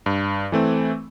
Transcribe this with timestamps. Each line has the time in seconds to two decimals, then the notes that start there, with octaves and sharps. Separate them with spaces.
0.06 G2
0.52 E3 A3 C4